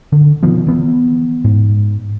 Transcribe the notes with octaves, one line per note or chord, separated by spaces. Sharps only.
D3
B2 D#3 F3 B3
E3 B3
G#2